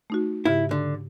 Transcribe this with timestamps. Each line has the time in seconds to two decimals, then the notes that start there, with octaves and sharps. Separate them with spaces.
0.10 A3 D#4 F#4
0.45 G#2 C#3 E4 G4
0.71 D3